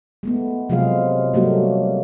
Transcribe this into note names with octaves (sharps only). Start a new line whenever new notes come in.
G#3 A3 B3
C3 F3 F#3 G#3 G#4 F5
F#3 G3 A3 A#3 F#4